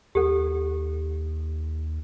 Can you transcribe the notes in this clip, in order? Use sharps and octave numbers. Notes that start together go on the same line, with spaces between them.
D#2 G4 A4